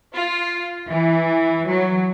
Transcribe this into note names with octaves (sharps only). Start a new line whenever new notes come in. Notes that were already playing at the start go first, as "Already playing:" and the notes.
F4
E3
F#3